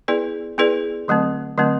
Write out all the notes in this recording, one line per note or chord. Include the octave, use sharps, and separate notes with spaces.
B3 E4 G#4 B4 D5
B3 E4 G#4 B4 D5
D3 F#3 A3 C4
D3 F#3 A3 C4